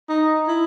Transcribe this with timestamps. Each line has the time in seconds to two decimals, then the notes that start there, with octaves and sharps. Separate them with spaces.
0.09 D#4
0.48 E4